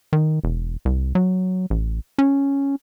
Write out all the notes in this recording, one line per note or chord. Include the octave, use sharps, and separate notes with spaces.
D#3
E1
C2
F#3
A1
C#4